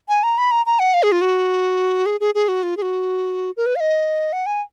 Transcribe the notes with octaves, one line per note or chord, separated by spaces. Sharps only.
G#5
A#5
B5
A#5
A#5
F#5
F5
G#4
F4
F#4
G#4
G#4
G#4
F#4
F4
G#4
F#4
A#4
B4
F5
D#5
F#5
G#5